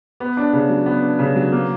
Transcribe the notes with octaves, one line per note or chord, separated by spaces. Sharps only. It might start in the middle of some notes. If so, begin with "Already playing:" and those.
B3
D4
C#3
F#3
B3
D4
C#3
F#3
A#3